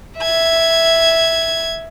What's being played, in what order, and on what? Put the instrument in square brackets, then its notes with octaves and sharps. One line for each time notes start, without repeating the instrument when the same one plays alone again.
[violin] E5 G#6